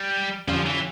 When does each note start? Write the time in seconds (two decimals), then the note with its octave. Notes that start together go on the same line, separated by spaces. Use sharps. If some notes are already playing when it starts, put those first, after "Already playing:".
Already playing: G3
0.47 F2 D3 F3 G3 C#4 F4
0.66 E3